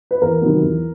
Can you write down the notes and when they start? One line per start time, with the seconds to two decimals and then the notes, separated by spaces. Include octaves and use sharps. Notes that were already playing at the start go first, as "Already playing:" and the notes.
0.11 B4
0.22 E2 A#4
0.42 C3 D#3 F#3 B3
0.62 E2